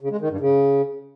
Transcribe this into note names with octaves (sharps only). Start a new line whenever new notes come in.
C#3
G#3
D#3
G2
C#3